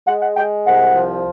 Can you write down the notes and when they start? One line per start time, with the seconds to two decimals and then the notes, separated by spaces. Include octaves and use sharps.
0.07 G#3 F#5
0.21 F#5
0.36 G#3 G5
0.66 C2 F#5
0.95 F3